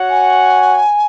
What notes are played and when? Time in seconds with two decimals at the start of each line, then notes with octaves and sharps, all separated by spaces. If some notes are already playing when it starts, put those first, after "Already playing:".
Already playing: F#4 C#5 F#5
0.10 G#5